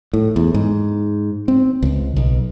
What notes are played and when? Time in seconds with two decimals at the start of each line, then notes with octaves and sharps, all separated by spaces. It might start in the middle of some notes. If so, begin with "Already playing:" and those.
0.13 A2
0.36 E2
0.54 G#2
1.48 C4
1.83 C#2
2.16 B1